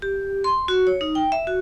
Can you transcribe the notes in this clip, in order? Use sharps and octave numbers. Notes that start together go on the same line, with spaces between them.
G4
C6
F#4
C#5
D#4
G5
E5
F#4